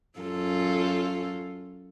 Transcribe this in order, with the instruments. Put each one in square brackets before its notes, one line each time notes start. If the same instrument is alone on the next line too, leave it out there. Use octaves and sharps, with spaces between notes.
[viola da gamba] F#2 F4 A4